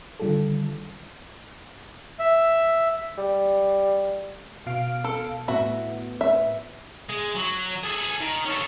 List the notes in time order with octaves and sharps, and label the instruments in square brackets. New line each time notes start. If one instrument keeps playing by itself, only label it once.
[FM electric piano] D3 D#3 G3 F4 G4 A4
[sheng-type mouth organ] E5
[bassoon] G3
[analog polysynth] B2 F5 D7
[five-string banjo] A4
[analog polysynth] A2 B3 [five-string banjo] F#4 E5
[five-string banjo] E5
[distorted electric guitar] G#3
F#3
G#4 A4
D#3
C#4 A4